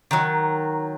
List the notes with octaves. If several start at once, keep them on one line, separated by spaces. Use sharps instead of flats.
D#3 F#3